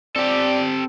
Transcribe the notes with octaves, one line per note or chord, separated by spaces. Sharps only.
C4 G4 A4 D5